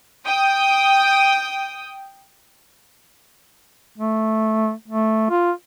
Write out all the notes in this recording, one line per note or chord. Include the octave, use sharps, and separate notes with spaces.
G5 D#6
A3
A3
F4